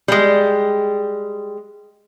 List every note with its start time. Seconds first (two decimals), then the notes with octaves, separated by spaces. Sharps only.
0.08 G3 G#3